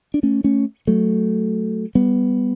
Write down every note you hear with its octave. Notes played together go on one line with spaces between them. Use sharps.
D4
A3 C#4
A3 C#4
F#3 A3
G3 B3